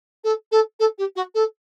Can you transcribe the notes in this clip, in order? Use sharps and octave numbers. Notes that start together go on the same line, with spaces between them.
A4
A4
A4
G4
F#4
A4